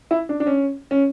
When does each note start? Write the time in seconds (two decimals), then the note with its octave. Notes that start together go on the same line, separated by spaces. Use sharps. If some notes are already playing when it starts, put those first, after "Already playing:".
0.11 E4
0.29 D4
0.40 D4
0.47 C#4
0.91 C#4